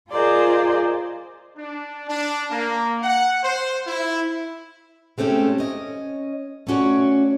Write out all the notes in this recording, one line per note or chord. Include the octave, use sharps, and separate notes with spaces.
F4 G#4 A#4 C5 D5 D#5
D4
D4
A#3
F#5
C5
E4
G#3 A3 C4 C#4 G4
C#4 C#5 D#5
A3 B3 C#4 F#4 C#5 D5